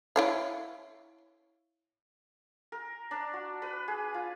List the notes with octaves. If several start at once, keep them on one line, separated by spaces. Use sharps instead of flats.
E4 C#5 F5
A#4
D4
F#4
B4
G#4
F4